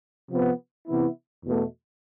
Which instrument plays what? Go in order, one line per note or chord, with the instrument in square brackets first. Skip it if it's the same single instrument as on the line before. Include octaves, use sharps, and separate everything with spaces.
[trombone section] C3 F3 B3
C3 E3 B3 E4
E2 B2 A3